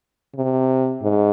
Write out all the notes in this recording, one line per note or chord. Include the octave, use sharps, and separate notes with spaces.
C3
G#2